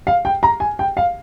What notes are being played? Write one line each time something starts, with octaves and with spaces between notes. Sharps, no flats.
F5
G5
A#5
G#5
G5
F5